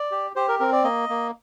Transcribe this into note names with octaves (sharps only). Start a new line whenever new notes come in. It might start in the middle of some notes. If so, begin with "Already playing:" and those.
Already playing: D5
G4
G4 C5
A#4
C4 A#4
D5
A#3 D#5
A#3